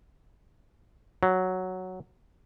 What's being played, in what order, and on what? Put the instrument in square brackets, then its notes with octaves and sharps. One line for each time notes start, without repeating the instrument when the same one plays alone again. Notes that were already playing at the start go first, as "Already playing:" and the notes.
[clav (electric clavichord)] F#3